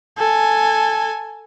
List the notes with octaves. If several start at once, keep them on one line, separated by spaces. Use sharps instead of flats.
A4 G#5